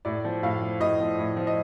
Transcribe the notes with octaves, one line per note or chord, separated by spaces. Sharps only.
A2 D5
F3
A2 F5
F3
A2 D#5
F3
A2
F3
D#5